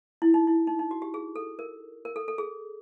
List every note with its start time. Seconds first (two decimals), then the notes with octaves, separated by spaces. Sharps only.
0.22 E4
0.34 D#4
0.47 E4
0.67 D#4
0.79 D#4
0.91 F#4
1.02 G4
1.14 G#4
1.36 A4
1.59 A#4
2.05 A#4
2.16 A4
2.28 A4
2.38 G#4